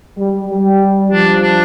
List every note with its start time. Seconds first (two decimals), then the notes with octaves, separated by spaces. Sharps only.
0.16 G3
0.48 G3
1.11 F3 D4
1.42 D4